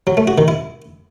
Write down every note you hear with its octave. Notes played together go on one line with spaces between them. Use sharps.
F#3
A3
F#4
D#3
E4